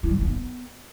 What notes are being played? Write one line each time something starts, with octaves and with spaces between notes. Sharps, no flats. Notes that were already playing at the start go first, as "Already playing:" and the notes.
E4
G3
C4
D#4
B3